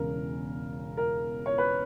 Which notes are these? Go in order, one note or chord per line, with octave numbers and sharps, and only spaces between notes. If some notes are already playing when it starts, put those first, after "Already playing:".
Already playing: E1 E2 C#3 A#4
A#4
C#5
B4